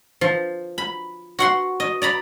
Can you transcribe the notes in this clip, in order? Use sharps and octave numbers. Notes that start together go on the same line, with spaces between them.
F3
B5
F#4 F#5 C6
D#5
D5 A#5 B5